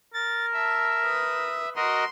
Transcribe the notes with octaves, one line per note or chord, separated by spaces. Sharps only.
A#4 A6
E5 A5
B4 D#6
F#4 A#4 D#5 C6